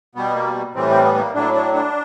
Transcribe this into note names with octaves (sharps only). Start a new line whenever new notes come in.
B2 G3 B3
A#3
A2 E3 G3 C4
C4
B3
B3
A#3
A2 F#3 D4
D4
D4